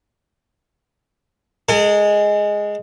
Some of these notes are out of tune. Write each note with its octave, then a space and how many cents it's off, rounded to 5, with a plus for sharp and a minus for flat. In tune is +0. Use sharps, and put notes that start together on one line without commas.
G#3 +0 A4 +45